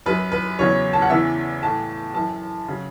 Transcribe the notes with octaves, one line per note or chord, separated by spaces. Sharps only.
F#2 F#3 B4
B4
E2 C#3 F#3 C#5
A5
F#5
E2 C#3 E3 E5
A2 E3 A5
F#2 E3 A5
C#3 F#3